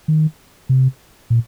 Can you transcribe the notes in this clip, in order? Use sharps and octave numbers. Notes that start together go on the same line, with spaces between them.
D#3
C3
A#2